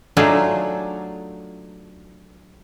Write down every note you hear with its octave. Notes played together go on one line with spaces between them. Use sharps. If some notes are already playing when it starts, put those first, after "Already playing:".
F#3 A3 D4 D#4 F4 G#4